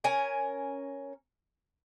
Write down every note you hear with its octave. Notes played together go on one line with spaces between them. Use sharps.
C#4 A#4 G#5